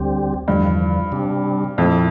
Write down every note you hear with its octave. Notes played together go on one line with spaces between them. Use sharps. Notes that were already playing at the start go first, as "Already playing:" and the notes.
Already playing: D2 D3 G3 C4 G4
E2 G2 D3 F3
C3 G3 D4
F2 A#2 A3 E4